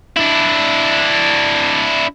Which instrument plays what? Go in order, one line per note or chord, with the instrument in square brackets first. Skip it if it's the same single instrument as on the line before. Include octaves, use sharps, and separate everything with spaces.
[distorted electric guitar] D4 E4